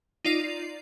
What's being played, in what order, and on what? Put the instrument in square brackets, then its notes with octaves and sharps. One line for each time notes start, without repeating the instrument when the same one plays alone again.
[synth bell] D#4 F4 D5 C7